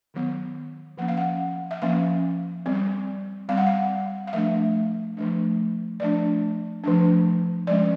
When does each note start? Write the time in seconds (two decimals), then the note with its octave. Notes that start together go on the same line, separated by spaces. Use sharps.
0.14 D#3 F#3 B3
0.98 F3 A#3 C#4 F#5
1.08 F5
1.17 F#5
1.71 E5
1.82 F3 A#3 C#4 F5
2.66 G3 C4
3.49 G3 C4 F5
3.58 F#5
3.67 F5
4.27 F5
4.33 F3 A3 D4 E5
5.17 F3 A3 D4
6.00 F3 A3 D4 D5
6.84 F3 A3 D4
7.67 F3 G#3 C#4 D5